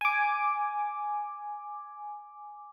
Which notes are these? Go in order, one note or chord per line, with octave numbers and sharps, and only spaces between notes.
G#5 D6